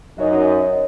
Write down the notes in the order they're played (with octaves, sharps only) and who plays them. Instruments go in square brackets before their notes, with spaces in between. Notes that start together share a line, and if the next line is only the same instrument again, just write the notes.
[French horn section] F#2 D#4 D#5 [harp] F#4 C#5